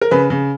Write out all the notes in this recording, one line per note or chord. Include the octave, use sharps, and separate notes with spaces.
A#4
C#3 B4
C#3